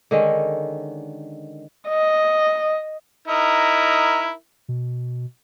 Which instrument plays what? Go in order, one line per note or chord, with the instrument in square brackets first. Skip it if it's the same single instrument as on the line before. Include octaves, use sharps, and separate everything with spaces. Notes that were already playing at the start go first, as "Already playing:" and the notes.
[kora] D3 D#3 G#3 C#4
[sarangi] D#5
[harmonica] D#4 E4 A#4
[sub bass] B2